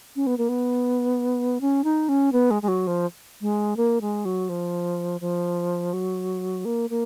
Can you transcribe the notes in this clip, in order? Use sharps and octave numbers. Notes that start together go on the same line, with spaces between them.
C#4
B3
A#3
B3
C#4
D#4
C#4
B3
G#3
G#3
F#3
F3
G#3
A#3
G#3
F#3
F3
F3
F#3
A#3
A#3